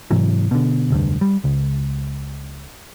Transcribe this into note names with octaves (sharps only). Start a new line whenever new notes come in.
G#2 C3 E3 F#3
B2 D3
F1 D2 G2
G3
C#2